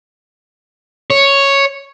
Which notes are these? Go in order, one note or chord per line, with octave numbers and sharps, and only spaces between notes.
C#5